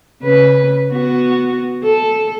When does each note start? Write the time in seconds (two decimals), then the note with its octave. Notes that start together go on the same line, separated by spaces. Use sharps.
0.23 C#3 B4
0.91 B3 F#4
1.84 A4